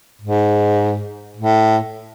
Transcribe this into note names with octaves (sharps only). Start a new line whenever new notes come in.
G#2
A2